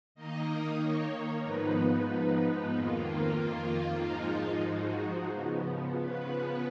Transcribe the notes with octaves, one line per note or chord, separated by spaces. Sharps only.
D#3 A#3 D#4 D#5
C#5
G#2 F3 B3 D#4 B4
F2 D#3 A#3 F4
G#2 F3 G#3 D#4
F#4
C#3 F3 B3
B4